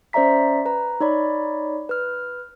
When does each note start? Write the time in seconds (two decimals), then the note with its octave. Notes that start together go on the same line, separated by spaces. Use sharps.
0.13 C#4 C5 D5 E5 A#5 B6
0.65 B4 A#5
1.00 D#4 C#5 D5 B5
1.89 B4 F6